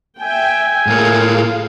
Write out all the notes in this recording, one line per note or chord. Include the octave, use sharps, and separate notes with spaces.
E5 G5 G#5
A2 A#3 G#4 A4 F5